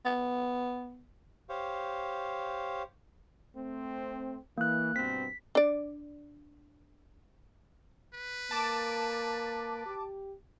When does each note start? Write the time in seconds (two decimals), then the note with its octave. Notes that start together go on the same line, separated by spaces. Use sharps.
0.05 B3
1.49 G4 C5 C#5 F5
3.56 A3 C4
4.58 E3 A#3 F#6
4.96 G2 B2 C4 B6
5.55 D4 D5
8.14 B4
8.51 A#3 A5 D6
9.86 G4